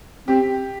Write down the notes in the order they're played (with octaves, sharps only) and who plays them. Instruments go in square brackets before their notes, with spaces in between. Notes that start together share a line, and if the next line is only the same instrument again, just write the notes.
[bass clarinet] C4 [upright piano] G4